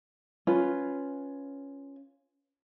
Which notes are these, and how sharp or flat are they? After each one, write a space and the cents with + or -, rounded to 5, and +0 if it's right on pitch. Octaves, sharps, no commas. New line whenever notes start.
C#4 +0 F4 +0 B4 +0